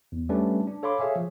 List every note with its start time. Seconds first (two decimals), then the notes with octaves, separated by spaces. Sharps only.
0.12 E2
0.29 G3 A3 C#4 D4 B4
0.67 D4
0.83 A4 C#5 F5 B5 C6 D6
0.99 G#4 A4 C#5 E5 F5 G#5
1.16 F3